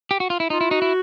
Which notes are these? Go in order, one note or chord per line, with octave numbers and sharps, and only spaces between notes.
G4
F#4
F4
E4
D#4 F4
E4
D#4 F#4
E4